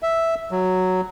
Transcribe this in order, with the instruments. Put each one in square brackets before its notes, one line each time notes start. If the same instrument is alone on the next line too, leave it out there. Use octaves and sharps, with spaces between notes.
[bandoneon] E5
F#3